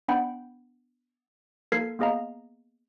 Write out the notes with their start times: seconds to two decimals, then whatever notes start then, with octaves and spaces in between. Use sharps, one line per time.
0.08 B3 D4 F#5 G5 B5 G6
1.72 A#3 A4 A#4 G#6 B6 C7
1.99 A#3 B3 G#4 D#5 F5 A#5